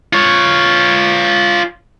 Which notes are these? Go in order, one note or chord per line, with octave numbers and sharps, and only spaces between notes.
F4 C#5